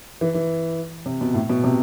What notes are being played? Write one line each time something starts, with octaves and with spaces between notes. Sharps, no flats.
E3
E3
C3
B2
A2
B2
C3